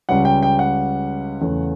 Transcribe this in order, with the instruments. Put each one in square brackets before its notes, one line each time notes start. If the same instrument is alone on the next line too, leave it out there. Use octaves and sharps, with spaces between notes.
[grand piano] C#2 C#3 G3 C#4 F#5
G5
G5
F#5
E2 C#3 E3 A3 C#4